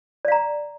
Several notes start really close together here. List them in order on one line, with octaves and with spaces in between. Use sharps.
D5 F5 A#5